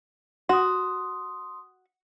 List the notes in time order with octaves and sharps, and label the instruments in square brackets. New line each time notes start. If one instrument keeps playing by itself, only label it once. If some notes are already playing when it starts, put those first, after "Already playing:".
[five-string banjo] F#4 [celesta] C6 D#6